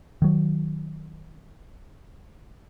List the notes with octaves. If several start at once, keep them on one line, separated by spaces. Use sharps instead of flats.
D#3 F#3